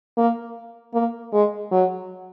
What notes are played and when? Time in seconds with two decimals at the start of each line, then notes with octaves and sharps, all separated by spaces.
0.18 A#3
0.94 A#3
1.33 G#3
1.72 F#3